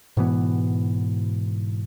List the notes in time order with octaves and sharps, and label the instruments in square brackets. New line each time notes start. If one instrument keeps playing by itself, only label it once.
[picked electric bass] G#2 B2 E3 B3